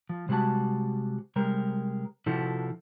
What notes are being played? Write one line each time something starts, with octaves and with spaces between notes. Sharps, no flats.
F3
C3 G3 G#3 F#4 A5
C3 G3 G#3 A#4
C3 F3 E4 F#4 A4